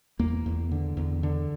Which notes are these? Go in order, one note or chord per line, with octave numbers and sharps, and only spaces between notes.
E2 A#3
E2
D3
E2
D3